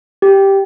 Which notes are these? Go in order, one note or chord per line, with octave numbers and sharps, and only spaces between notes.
G4